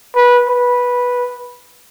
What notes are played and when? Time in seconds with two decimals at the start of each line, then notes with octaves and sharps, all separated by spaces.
0.15 B4
0.48 B4